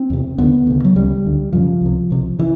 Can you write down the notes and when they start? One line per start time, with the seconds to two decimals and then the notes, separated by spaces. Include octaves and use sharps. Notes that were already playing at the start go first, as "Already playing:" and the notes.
Already playing: C4
0.10 E2 C3
0.38 D#2 D3 B3
0.67 D2 C#3
0.85 F#3
0.95 C#2 C#3 G3
1.25 D2 D3
1.53 F#2 C#3 F3
1.81 C#2 C3
2.10 C2 C3
2.39 C#3 E3